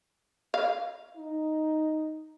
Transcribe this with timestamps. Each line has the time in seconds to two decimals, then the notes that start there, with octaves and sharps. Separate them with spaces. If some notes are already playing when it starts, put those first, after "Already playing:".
0.54 F5
1.17 D#4